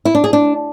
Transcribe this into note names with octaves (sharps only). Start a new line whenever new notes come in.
E4
D4
G#4
D4